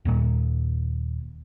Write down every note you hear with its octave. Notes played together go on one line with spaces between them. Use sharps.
D#1 D#2 A#2